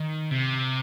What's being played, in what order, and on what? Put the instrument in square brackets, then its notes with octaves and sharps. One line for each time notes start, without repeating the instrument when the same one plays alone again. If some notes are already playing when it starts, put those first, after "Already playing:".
Already playing: [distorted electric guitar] D#3
C3